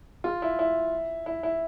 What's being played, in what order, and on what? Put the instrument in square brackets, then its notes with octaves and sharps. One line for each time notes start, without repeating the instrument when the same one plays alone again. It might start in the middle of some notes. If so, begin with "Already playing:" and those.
[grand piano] F4
E4
E4
E4
E4